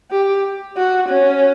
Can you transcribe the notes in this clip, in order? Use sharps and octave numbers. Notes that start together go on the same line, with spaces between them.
G4
F#4
C#4